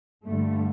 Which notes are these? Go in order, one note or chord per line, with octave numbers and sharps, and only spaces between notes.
G2 D3 G3 A3